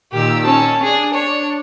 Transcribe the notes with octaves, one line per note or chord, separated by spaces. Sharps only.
A#2 D#3 G4 E6
C#4 A5
D4 G#4
C#5